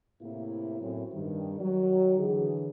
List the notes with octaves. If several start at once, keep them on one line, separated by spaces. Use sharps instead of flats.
A2 C3 A#3 E4
F#2 A2 C4
G2 D#3 G3
D#3 F#3
D3 E3 G#4